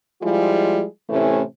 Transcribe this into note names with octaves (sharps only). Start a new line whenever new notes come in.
F3 G3 G#3 E4 F4 G#4
A2 C3 E3 A3 C#4 E4